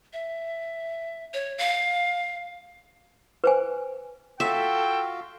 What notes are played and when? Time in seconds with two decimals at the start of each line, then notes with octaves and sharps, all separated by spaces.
0.13 E5
1.34 C#5
1.58 F5
3.44 B4 C5 G#5
4.40 F4 F#4 A4 E5 F5 G5